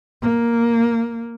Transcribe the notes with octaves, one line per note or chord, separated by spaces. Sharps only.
A#3